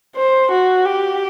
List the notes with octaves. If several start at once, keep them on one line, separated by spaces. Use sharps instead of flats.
C5
F#4
G4